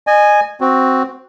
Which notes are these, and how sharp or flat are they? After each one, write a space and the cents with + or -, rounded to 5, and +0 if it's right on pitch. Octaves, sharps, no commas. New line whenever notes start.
D#5 -30 G#5 +0
C4 +0 F#4 +0